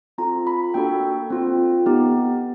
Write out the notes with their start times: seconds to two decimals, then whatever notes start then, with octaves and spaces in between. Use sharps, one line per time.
0.18 C4 F4 A4 A#5
0.47 B5
0.74 A#3 D4 F#4 A4 G5
1.30 C4 F4 A4
1.86 B3 D#4 G4